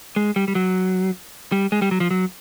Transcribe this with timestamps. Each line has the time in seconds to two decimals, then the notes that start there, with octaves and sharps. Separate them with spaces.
0.16 G#3
0.36 G3
0.48 G3
0.55 F#3
1.52 G3
1.72 G#3
1.82 G3
1.91 F#3
2.00 F3
2.11 F#3